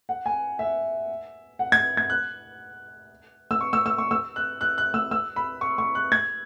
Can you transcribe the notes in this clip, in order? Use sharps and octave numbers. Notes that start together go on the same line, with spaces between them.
F#5
G#5
E5
F#5
G#6
G#6
F#6
E6
C#6
E6
E6
C#6
E6
F#6
F#6
F#6
E6
E6
B5
C#6
C#6
F#6
G#6